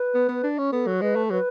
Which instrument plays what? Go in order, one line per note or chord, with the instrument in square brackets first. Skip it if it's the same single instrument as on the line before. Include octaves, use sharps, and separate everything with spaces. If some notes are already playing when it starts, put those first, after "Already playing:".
Already playing: [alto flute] B4
[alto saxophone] B3
B3
D4
C#4
[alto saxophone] B3 [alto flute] A4
[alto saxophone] F#3
[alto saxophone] G#3 [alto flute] B4
[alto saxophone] A3
[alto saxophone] F#3 [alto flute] B4